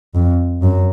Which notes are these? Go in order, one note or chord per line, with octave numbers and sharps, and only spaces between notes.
F2
F#2